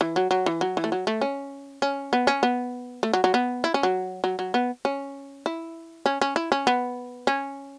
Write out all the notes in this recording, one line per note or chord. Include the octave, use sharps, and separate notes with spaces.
E3
F#3
F#3
E3
F#3
E3
A3
F#3
A3
C#4
C#4
B3
C#4
B3
A3
F#3
F#3
B3
E4
C#4
F#3
F#3
F#3
B3
C#4
E4
C#4
C#4
E4
C#4
B3
C#4